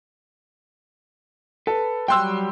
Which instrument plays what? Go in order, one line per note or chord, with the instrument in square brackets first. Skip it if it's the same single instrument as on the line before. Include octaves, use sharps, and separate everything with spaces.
[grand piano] A4 [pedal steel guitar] B4
[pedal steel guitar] F#3 G3 F#6 [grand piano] G5 C6 E6